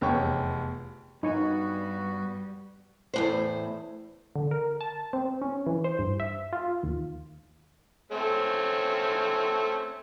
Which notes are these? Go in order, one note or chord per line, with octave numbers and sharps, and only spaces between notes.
F1 E2 G4 C#5 C#6
G2 G3 B3 D#4 F#4 C#5 G#5
E2 A2 C5
D3
A#4
A5
C4
C#4
E3
C5
G2
E5
F4
D#2
A3 C4 C#4